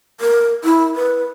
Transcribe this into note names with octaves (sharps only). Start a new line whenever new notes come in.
A#4
E4
B4